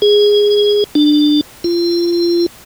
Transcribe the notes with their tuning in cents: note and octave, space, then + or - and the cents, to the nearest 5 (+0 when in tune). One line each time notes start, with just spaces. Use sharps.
G#4 -5
D4 +20
F4 -25